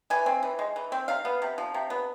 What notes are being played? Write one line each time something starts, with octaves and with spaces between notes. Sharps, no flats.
E3 G#5
C4
E3
G#3
E3
C4
C3 F5
B3
C3
F3
C3
B3